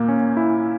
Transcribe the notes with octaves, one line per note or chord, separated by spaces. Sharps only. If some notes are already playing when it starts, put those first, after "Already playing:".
Already playing: A#2 A#3
C#4
E4